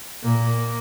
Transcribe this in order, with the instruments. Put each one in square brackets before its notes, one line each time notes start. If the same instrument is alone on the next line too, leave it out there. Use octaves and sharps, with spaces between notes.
[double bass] A#2 [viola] A#3